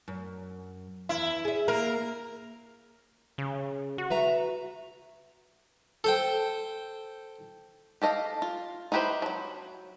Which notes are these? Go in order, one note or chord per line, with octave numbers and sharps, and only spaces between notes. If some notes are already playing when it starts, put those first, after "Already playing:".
F#2
E2 E4
G#4 E5
A#3 A#4
C#3
F#4
B4 E5 A#5
A4 C5 G5
G4 A4 D#5 F5
F4
D#4 E4 G4 B4 C5
F3 F#3